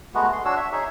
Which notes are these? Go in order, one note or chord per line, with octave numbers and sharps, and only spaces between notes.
G#3 A3 B3 F#4
C6
D4 F#4 C#5 E6
E5
D#4 G#4 C#5 E5